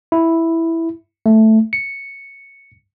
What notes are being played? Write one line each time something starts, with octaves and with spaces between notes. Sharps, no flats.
E4
A3
C#7